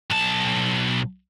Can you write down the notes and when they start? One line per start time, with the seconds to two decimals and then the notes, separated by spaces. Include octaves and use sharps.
0.11 B1 A5